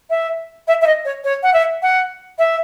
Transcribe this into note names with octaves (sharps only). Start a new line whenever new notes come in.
E5
E5
E5
D#5
C#5
C#5
F#5
E5
F#5
E5